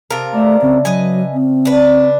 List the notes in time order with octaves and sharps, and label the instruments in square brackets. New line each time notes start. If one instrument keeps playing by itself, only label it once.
[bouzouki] C3 A#4 [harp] F5 A5
[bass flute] A3 [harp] D5 E5
[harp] C#3 [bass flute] C4
[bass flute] F#3 [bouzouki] B4 D#5 G#5
[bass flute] C4
[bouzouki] D4 B4